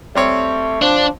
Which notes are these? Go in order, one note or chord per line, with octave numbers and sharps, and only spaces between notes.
G3 A3 C4 C#5
F3 D4